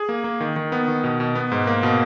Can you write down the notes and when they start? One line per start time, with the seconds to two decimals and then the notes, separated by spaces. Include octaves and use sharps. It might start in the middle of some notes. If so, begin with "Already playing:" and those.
Already playing: G#4
0.09 A#3
0.24 A#3
0.40 D#3
0.56 D#3
0.72 B3
0.88 D#3
1.04 B2
1.20 B2
1.35 B3
1.52 G#2
1.67 A#3
1.83 B2